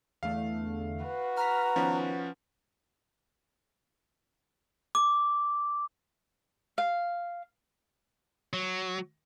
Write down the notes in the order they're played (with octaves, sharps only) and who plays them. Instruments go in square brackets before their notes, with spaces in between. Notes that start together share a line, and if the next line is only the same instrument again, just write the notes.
[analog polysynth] E2 D3 A3 [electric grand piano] F5
[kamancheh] F#4 B4
[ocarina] A#5 [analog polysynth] F6 B6
[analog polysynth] D#3 B3 [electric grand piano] F3 C#4
[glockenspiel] D6
[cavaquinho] F5
[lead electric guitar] F#3